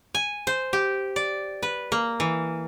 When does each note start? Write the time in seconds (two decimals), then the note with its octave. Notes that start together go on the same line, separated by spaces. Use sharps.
0.15 G#5
0.47 C5
0.73 G4
1.16 D5
1.63 B4
1.92 A#3
2.20 E3